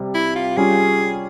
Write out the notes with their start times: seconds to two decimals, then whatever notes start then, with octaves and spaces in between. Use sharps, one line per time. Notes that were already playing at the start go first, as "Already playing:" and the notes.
Already playing: C3 G3
0.15 E4
0.36 F4
0.57 G3 C#4 F4 G#4